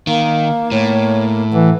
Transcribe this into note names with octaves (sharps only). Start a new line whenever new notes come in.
D#3 A#3 F5
A2 C#5
E3 A4 F#5